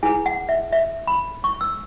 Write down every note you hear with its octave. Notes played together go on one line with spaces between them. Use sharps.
E4 G#4 B4 G#5
F#5
E5
E5
B5
C#6
E6